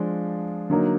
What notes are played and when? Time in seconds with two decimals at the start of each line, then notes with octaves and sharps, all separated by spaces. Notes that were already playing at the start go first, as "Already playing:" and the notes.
Already playing: F3 G#3 D4 F4
0.70 D3 F#3 A#3 D#4